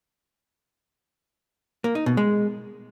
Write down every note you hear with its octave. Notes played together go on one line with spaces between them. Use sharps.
A#3
D#4
B2
G#3